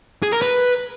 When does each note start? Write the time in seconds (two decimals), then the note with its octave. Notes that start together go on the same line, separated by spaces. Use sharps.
0.23 G#4
0.32 A#4
0.42 B4